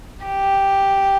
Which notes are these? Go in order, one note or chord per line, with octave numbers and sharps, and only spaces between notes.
G4